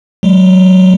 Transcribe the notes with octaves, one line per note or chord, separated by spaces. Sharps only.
F#3 G#3